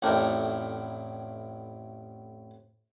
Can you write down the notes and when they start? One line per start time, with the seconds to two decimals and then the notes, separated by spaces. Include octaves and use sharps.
0.02 A1 F2 A2 D4 A#4 G5